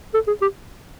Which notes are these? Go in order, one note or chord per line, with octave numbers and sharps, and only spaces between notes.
A4
G#4
G4